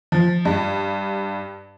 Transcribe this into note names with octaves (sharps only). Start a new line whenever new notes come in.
F3
G2